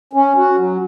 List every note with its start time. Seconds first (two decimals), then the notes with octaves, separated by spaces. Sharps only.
0.13 C#4
0.36 F#4
0.57 F#3